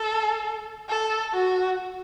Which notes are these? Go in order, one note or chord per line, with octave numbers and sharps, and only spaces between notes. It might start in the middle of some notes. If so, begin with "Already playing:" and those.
Already playing: A4
A4
F#4